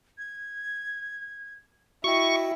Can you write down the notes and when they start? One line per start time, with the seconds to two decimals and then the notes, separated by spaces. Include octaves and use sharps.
0.18 G#6
2.04 E4 F#4 D#5 G5 C#6